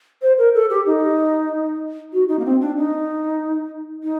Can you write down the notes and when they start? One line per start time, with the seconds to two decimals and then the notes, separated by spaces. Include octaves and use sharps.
0.22 C5
0.38 A#4
0.55 A4
0.70 G4
0.86 D#4
2.13 F#4
2.29 D#4
2.39 A#3
2.45 C4
2.61 D4
2.77 D#4
4.04 D#4